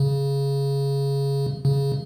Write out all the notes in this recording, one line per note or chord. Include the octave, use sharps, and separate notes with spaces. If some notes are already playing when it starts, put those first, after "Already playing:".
Already playing: C#3
C#3